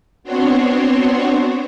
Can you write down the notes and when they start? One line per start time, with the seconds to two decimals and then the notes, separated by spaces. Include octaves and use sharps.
0.23 B3 C4 D4 F#4 C5 C#5